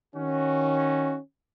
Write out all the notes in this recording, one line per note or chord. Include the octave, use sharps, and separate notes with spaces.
D#3 C#4 F#4